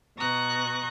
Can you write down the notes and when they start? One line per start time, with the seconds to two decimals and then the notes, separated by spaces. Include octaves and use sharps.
0.17 B2 A#5 C#6 D#6 F#6